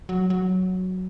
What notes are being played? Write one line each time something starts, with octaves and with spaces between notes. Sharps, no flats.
F#3
F#3